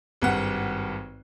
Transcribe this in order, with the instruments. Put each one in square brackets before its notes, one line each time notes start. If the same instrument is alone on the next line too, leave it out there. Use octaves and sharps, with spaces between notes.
[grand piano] G#1 G2 F#5